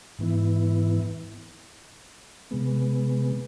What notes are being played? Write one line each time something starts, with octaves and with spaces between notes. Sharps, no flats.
G#2 E3 B3 E4
C3 G#3 B3